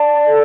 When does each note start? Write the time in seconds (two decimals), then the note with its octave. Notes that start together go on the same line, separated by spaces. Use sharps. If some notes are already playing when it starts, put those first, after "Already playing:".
Already playing: D5 A5
0.25 A4